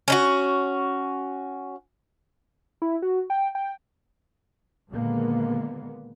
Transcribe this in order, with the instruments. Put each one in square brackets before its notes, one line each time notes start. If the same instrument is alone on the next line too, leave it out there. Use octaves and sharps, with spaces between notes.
[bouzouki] C#4 D#4 F#4
[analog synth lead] E4
F#4
G5
G5
[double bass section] A#2 D3 D#3 G#3 A#3 B3